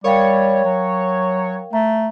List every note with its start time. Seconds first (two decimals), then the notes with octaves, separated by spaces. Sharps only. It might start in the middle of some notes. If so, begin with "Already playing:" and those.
0.04 G3 A#4 C#5 F5 G5
0.65 F#3
1.73 A3 A#5